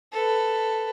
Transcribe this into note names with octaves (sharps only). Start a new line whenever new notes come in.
A4 B4